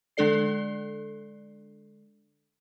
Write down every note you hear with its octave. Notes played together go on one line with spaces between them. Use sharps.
D3 G#3 D4 A4 D5 C7